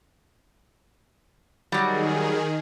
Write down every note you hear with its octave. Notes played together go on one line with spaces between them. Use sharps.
D#3 F#3 G3 G#4